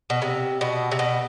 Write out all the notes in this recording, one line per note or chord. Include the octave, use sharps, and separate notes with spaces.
B2
C3
B2
C3
B2